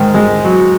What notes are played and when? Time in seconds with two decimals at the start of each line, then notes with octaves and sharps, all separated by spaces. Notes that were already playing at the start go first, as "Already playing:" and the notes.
Already playing: G#2 D#3
0.14 G#3
0.45 F#3